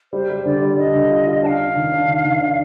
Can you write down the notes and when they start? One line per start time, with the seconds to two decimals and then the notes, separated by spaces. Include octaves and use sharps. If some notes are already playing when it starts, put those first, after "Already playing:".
0.13 G3 C5
0.30 G3
0.45 D3 D5
0.62 G3
0.78 D4 D#5
0.94 D3
1.10 F4
1.27 F4
1.43 D4 A5
1.47 F5
1.60 D4
1.76 D#3
1.92 D4
2.09 D#3
2.25 D#3
2.41 D4